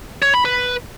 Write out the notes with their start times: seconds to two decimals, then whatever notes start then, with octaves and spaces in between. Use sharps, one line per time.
0.22 C#5
0.34 B5
0.45 B4